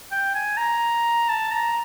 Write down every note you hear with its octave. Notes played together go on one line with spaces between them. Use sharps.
G5
G#5
A#5
A5
A#5